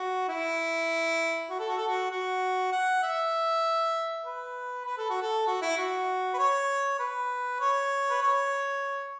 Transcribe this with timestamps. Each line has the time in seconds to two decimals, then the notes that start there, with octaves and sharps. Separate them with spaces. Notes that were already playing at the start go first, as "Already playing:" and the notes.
Already playing: F#4
0.29 E4
1.50 F#4
1.59 A4
1.68 F#4
1.77 A4
1.86 F#4
2.11 F#4
2.72 F#5
3.03 E5
4.25 B4
4.86 B4
4.98 A4
5.10 F#4
5.21 A4
5.47 F#4
5.62 E4
5.77 F#4
6.34 B4
6.38 C#5
6.99 B4
7.60 C#5
8.10 B4
8.22 C#5